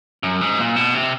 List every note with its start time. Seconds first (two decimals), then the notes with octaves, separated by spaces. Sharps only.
0.23 F#2
0.41 G#2
0.59 A#2
0.76 B2
0.95 C3